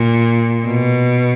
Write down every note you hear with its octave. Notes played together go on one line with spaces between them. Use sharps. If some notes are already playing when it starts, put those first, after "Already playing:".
Already playing: A#2
B2